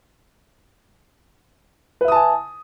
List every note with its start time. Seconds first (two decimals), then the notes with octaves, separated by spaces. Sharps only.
2.01 B4
2.05 E5
2.08 D#6
2.12 A5
2.15 G#5